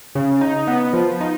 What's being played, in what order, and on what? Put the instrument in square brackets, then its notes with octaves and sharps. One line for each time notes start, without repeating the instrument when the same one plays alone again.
[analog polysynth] C#3
D#4
B3
F3
D#4